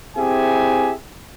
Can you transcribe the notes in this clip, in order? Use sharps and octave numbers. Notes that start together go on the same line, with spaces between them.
C4 E4 G4 G#4 E5 G#5